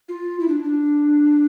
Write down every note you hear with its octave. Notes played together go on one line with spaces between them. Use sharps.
F4
E4
D4
D4